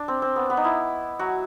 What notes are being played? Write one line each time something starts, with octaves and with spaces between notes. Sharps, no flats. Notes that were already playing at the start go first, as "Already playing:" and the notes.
Already playing: D4
C4
C4
B3
B3
D#4
E4
F#3 F#4